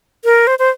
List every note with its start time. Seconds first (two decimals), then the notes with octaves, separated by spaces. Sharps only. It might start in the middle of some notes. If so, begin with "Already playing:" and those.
0.25 A#4
0.47 C5
0.59 C5